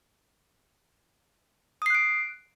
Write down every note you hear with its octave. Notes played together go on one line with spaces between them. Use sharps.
D#6 F#6 C7 D7